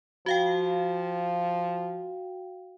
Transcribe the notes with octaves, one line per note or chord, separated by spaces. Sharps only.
F3 F#4 F5 G5